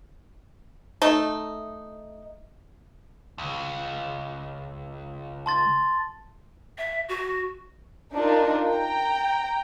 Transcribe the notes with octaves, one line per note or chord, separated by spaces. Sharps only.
A3 D#4
C#2
A5 C6 A6
E5
F#4
D4 D#4 F4 A#4
G5 A#5